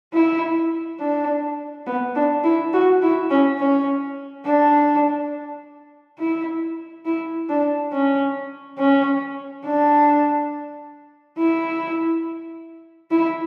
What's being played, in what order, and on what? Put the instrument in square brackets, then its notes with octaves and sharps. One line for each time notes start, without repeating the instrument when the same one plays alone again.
[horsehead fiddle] E4
D4
B3
D4
E4
F#4
E4
C#4
C#4
D4
E4
E4
D4
C#4
C#4
D4
E4
E4